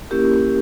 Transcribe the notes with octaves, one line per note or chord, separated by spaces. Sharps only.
A#3 C#4 E4 G4 A#4